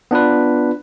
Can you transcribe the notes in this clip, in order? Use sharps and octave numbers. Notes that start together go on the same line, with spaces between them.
B3 D4 F4 B4